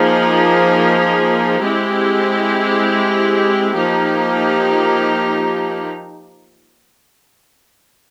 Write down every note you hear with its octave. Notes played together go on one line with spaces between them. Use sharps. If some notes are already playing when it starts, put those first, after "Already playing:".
Already playing: F3 A#3 D#4 G#4
G#3 C4 E4 G4
F3 A#3 D#4 G4